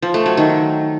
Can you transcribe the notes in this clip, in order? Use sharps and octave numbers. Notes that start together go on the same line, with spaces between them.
F3
A3
F#3
D#3